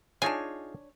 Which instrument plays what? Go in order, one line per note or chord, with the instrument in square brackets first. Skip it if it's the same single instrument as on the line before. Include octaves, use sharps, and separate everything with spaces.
[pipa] D4 C#5 [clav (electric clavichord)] D#4 F4 G#4 [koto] G#5